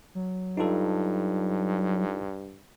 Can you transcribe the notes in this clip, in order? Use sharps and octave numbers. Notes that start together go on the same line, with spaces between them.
F#3
G2 D#4 F4 A4